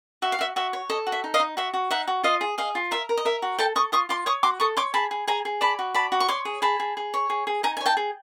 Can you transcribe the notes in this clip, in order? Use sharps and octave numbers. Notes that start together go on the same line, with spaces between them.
F#4 E5
F5
F#4 E5
F#4 E5
C#5
A4 D#5
F#4
E5
D#4
D#5 F5
D#4
F#4 E5
F#4
D#4 E5 F#5
F#4
F4 D#5 F5
G#4
G#4 D#5 F5
F4
A#4 E5
A#4
D#5
A#4 E5
F#4
A4 G5 A5
A4 C#6 D#6
F4 C#6 D#6
F4 C6 D6
C#5 C#6 D#6
F#4 C6 D6
A4 C#6 D#6
C#5 C6 D6
G#4 A5 B5
G#4
G#4 G#5 A#5
G#4
D5 A5 B5
F#4
D5 A5 B5
F#4
C#6
C#5 C6 D6
G#4
G#4 A5 B5
G#4
G#4
C#5
G#4
G#4
D#4 G#5 A#5
C#5 G#5
G5 A5
G#4